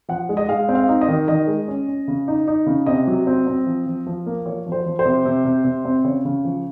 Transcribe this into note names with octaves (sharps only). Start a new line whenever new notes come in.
F3 F#5
G#3
D#5
G#3 F5
C4
F5
D#4
D#5
D#3
D#3 D#5
G#3
C#4
C#4
C#3
D#4
D#4
C#3
C3 D#5
F#3
C4
C4
F3
F3
F3
A#3
F3 C#5
F3
C5
F3
C5
C3
C3
C3
C3
C4
C#3 C#5
C#3
F3